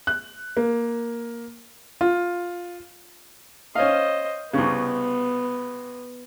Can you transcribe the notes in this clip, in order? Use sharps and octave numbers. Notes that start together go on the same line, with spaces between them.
F#6
A#3
F4
C#4 C5 D#5 F5
C2 C#3 B3